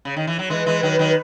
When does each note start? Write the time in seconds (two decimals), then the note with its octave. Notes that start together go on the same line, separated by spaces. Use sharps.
0.05 C#3
0.17 D#3
0.27 E3
0.39 F#3
0.50 E3 G#3 B4
0.66 E3 G#3
0.83 D#3 F#3
0.99 D#3 F#3